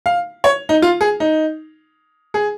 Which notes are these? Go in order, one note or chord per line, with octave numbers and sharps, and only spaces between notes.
F5
C#5
D#4
F4
G#4
D#4
G#4